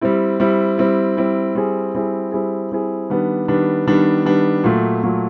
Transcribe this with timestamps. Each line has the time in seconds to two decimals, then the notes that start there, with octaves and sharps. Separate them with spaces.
0.01 G3 C4 E4
0.40 G3 C4 E4
0.78 G3 C4 E4
1.17 G3 C4 E4
1.55 G3 C4 E4 G#4
1.95 G3 C4 E4 G#4
2.32 G3 C4 E4 G#4
2.72 G3 C4 E4 G#4
3.10 D#3 G3 B3 D4
3.48 D#3 G3 B3 D4
3.87 D#3 G3 B3 D4
4.25 D#3 G3 B3 D4
4.64 A#2 F#3 A3
5.03 A#2 F#3 A3